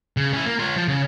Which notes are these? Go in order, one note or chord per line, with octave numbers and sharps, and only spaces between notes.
C#3
C#4 E4
A#3
F4 C#5
F3
C#3